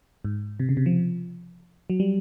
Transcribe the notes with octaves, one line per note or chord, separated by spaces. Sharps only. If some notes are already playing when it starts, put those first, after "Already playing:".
G#2
C3
C#3
C3
F3
F#3
G3